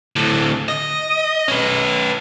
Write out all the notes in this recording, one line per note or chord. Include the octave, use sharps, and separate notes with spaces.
D2 A2
D#5
C#4 B4